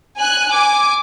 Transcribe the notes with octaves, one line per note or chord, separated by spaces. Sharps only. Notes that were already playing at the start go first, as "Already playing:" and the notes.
G#5 F#6
G#5 D6